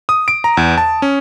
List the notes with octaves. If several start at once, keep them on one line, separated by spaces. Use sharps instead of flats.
D#6
D7
A#5
E2
A5
C#4